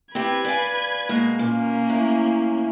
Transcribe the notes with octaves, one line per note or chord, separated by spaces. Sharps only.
C4 G4 B4 G#6
D5 F5 G#5
B2 G#3 A#3
A#2 A#3 C#4
A2